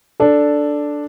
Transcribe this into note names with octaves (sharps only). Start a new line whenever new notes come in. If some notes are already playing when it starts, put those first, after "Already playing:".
D4 A4